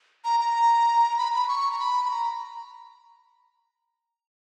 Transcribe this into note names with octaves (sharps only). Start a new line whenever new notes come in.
A#5
A#5
B5
B5
C#6
A#5
B5
B5
A#5